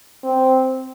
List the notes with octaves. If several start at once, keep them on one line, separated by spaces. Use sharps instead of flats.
C4